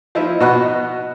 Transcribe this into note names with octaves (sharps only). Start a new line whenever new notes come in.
F3 D#4 E4 E5
B2 F#4 D#5 B5 F#6